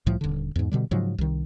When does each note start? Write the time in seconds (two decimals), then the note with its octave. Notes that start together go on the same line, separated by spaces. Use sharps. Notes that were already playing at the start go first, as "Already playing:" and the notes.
0.06 C2 A2 F3
0.21 D#1 D3
0.56 E2 G#2
0.72 B2 D3 G3
0.91 G#2 C#3 F3 F#3
1.18 C2 D#3